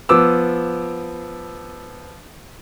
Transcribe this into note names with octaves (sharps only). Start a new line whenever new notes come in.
F3 B3 D6 E6